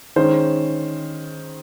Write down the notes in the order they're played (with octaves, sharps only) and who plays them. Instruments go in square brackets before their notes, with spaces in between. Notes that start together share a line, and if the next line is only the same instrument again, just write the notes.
[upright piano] D#3 G#3 C#4 C5